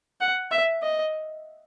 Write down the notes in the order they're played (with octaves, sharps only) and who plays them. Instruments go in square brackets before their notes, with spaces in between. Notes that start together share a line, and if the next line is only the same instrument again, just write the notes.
[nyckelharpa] F#5
E5
D#5